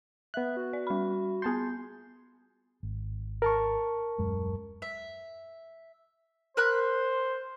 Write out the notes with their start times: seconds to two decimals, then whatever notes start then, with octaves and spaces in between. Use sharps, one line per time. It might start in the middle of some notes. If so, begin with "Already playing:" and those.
0.34 B3 E5 F#6
0.57 F#4
0.73 D5
0.87 G3 B5
1.42 B3 G#4 A5 C6 G6
2.83 G#1
3.42 A#4 A5 C#6
4.18 D#1 F#2 G#3
4.82 E5
6.57 A#4 C5 B5 F#6